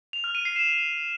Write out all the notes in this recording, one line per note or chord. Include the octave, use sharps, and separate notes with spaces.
F7
F6
D#7
C7
E7